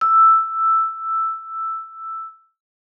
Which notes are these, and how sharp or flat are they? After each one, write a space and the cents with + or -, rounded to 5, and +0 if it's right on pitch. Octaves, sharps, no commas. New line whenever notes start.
E6 +5